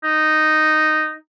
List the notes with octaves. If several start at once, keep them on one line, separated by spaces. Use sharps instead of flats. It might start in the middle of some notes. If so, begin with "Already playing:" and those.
D#4